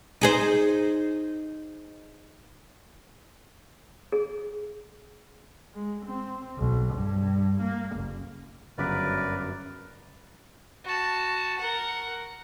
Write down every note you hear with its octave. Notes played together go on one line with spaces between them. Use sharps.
D#4 G#4 C5
G#4
G#3
C4
B1
G2
A#3
F#1
G1 F#2 C#3 A#4 B4 D5 B6
F#4 A5
A#4 F#5